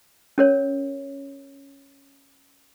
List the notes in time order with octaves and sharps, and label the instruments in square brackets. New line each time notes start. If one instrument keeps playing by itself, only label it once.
[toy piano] C#4 A#4 C#5